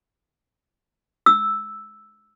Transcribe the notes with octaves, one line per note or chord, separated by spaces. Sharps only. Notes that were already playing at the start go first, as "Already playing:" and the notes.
E6